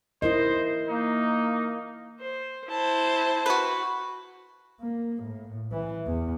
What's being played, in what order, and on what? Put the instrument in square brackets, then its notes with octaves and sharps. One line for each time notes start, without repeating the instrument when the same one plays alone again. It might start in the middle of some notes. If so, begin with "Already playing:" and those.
[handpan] E4 A#4 D#5 [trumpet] C5
[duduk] A#3 [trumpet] D#4
[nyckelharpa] C5
[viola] E4 C5 [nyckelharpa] A5
[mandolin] F#4 B4
[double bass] A#3
A2
E3
E2